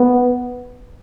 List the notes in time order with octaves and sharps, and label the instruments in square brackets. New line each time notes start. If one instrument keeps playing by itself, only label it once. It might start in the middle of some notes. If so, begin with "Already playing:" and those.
Already playing: [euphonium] B3